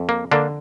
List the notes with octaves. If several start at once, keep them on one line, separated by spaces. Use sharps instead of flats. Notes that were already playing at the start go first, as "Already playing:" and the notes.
Already playing: F2
A#3
D3 A#3 D4